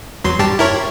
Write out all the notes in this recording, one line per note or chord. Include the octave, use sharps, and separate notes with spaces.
E2 F#3 C6
G2 G4 A5
E4 A#4 C#5